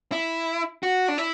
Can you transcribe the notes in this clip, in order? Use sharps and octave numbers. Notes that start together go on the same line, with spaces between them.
E4
F#4
D4
E4